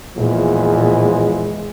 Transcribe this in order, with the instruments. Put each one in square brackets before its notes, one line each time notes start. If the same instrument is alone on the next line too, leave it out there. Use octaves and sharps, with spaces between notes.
[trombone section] E2 F3 G#3 [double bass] A#2